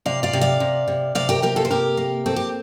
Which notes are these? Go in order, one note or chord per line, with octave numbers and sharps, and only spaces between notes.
C3 D5 F5
D5 F5
C3
D5 F5
C3
C3
C3 D5 F5
G4 A#4
A#3 G4 A#4
F4 A4
C5
C3 G4 A#4
A#3
C4 A4
G4